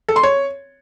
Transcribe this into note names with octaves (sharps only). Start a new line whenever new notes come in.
A4
C6
C#5